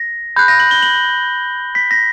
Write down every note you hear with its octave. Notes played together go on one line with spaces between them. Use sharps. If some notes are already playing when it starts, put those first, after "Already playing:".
Already playing: A#6
B5 F#6 G6
A#6
F#7
G7
F#7
B6
A#6